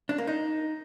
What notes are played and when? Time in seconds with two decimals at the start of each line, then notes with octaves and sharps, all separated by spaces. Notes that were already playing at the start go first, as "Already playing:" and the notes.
0.09 D4
0.18 A#3
0.27 D#4